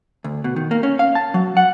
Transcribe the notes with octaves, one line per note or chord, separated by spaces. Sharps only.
D2
B2
D#3
A#3
C#4
F5
A5
F#3
F#5